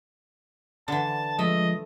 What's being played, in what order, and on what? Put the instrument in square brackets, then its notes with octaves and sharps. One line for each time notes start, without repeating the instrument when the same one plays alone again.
[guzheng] D3 E3 [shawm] A5
[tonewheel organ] F3 G#3 [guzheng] A3 [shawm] D#5